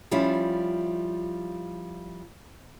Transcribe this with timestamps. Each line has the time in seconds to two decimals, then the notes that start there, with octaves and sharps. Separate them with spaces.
0.11 F3 G3 C#4 E4 F4